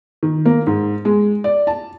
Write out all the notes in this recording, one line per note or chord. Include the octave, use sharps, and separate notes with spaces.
D#3
A#3
G#2
G#3
D5
A5